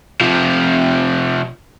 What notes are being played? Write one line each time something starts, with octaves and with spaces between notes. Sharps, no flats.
C3 F3